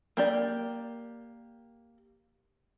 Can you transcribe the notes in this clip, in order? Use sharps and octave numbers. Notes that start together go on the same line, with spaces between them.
A#3 G4 D5